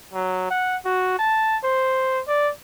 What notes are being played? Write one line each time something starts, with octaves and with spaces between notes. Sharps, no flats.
F#3
F#5
F#4
A5
C5
D5